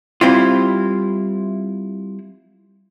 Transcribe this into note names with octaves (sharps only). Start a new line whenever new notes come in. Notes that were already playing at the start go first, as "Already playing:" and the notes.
G3 C4 E4 F4